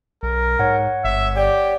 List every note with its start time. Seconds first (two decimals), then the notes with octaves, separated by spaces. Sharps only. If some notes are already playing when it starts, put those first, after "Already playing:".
0.23 B1 A#4
0.59 G#2 C#5 F#5
1.04 G1 E5
1.36 G4 D5